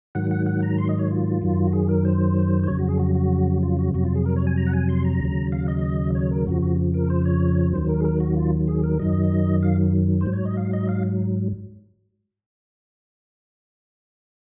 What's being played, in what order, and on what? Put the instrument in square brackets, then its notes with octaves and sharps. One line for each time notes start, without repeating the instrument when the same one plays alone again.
[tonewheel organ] G#2 D#3 F#3 F#5
F#5
F#5
A#5
C6
D#5
C#5
F4
F#2 D#3 F#3
F#4
G#4
A#4
C5
C5
F2 C#3 F#3 C#5
F#4
G#4
F#4
F#4
F4
F#4
F2 C3 F#3 F#4
F4
G#4
A#4
C#5
G#5
A#5
F#5
G#5
C6
A#5
D#2 C#3 F#3
F5
D#5
C#5
A#4
F2 C#3 F3 F#4
F#4
A#4
C5
C#5
D#2 D#3 F#3 C5
A#4
G#4
A#4
F#4
F4
G#4
A#4
F#2 D#3 F#3 D#5
F5
C5
G#2 F#3
C#5
D#5
F5
D#5
F5